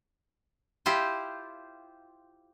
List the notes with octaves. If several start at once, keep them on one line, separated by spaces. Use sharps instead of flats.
E4 F4 G4 C5